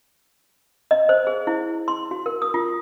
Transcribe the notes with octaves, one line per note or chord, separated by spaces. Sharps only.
D#5
C5
G#4
E4
C6
F#4
A#4
D#6
F4